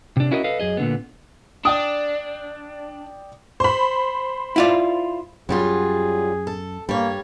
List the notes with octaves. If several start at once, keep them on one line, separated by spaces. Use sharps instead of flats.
C3 D4
C#4 E4 F#4 A#4 C5 D#5
A4 B4 D#5 F5
F#2 G#4 D#5
A#2 D3 B3
D4 D5 G5 D#6
C5 B5
E4 F4 D5
F#2 F#3 G3 F4 G#4
A4
G2 G3 A#3 C#5